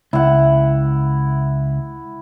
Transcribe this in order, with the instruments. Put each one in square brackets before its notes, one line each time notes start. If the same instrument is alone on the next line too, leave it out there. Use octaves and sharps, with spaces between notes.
[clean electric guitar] C#2 [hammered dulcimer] E4 F#5